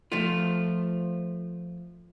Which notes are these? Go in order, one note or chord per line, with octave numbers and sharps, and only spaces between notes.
F3 A3 F4